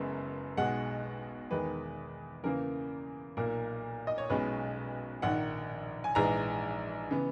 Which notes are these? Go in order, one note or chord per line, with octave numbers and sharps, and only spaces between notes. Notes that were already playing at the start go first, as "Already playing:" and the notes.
Already playing: F#1 F#2 C#3 G#3 B3
B1 B2 G#3 F#5
E2 D#3 G#3 B4
E2 C#3 E3 A#3 A#4
B1 A#2 A#3 A#4
D#5
C#5
B1 B2 G#3 C#4 B4
A#1 G#2 D#3 F#5
G#5
A#1 G#2 E3 G#3 A#5
C#3 E3 B3